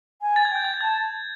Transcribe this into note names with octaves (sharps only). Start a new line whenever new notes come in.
G#5
A6
G#6
G5 G6
G#6
A6
A5 G#6